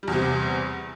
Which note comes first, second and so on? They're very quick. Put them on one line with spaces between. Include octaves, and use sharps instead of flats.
G3 E2 C3